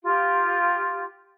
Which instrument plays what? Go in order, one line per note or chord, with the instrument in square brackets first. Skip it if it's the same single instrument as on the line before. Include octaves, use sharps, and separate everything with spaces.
[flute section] F4 G4